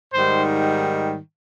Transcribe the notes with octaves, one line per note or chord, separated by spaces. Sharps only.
G#2 D#3 G3 C5